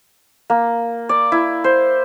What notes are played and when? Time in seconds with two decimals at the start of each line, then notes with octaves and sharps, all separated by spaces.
0.50 A#3
1.09 D5
1.32 E4
1.64 C5